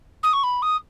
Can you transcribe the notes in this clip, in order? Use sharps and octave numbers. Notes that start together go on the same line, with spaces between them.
D#6
C#6
B5
D#6